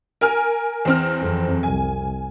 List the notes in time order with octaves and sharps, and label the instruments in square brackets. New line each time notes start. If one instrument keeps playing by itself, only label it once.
[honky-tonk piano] A#4 G#5 F6
E2 C4 F6
[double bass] F2
[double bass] C2 [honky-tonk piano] G#5